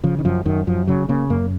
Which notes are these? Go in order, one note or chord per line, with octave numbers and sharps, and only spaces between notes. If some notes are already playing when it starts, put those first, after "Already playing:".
C#3 F3
D#3
F#2 F3
F#2 D#3
F#2 F3
C#3 F#3
C#3 A#3
F#2 A#3